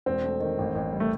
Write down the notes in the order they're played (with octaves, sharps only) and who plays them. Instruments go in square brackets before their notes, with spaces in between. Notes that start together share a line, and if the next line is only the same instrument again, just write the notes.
[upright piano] E1 [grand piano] C4
[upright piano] A3
D#3
A1
A1
G3
[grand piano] A3